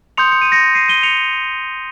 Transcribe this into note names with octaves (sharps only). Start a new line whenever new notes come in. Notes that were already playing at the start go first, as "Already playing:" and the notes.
C6 D#6 G6 C#7 F7
C#7
D#7
A#6 C#7
C7 D#7
D#7 G7
C#7 F7